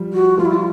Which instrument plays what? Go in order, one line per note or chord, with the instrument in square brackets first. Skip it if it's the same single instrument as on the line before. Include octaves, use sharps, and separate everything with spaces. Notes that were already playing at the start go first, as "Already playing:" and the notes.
Already playing: [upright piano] F3 G3
[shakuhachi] F#4
[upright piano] F3 G3 [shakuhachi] F4
[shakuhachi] E4
F4